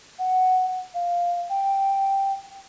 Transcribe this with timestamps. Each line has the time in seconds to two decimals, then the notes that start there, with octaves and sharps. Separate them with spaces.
0.19 F#5
0.94 F5
1.50 G5